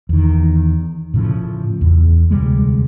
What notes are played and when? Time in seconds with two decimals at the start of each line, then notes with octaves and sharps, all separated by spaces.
0.09 E2 D#3
1.14 A2 C#3 F3
1.81 E2
2.31 D2 C3 G3 G#3